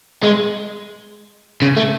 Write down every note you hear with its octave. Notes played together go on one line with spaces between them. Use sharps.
G#3
C#3
A3